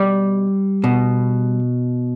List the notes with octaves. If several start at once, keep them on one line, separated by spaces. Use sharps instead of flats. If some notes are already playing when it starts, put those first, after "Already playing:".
Already playing: B2 G3
B2